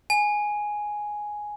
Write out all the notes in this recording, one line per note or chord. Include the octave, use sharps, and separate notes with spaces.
G#5